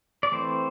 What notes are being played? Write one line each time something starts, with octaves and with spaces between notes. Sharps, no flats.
D5
E3 A3 C4 C5